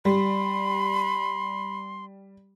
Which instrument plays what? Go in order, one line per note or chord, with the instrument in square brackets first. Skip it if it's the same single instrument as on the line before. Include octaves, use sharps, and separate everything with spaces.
[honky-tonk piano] G3 [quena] B5 [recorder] C6